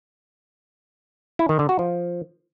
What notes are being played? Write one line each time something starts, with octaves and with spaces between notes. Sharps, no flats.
E4
D#3
D3
F#4
F3